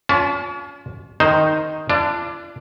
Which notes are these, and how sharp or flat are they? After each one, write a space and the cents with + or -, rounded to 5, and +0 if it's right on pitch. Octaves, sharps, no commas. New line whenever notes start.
C#4 +40 F4 +25 A5 -30
D#3 +0 D#4 +0 C5 +0
D4 +0 F4 -45